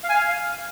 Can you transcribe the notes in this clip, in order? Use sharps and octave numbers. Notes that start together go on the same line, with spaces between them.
F5
G#5
F5